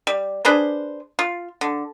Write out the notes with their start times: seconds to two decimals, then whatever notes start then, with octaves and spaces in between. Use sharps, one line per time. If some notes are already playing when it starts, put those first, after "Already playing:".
0.07 G3
0.45 D4 G#4 B4 C5
1.19 F4
1.61 D3